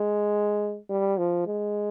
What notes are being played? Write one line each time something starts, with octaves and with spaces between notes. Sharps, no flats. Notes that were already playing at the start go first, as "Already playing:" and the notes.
Already playing: G#3
G3
F3
G#3